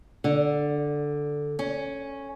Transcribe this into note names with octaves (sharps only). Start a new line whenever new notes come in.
D3
C#4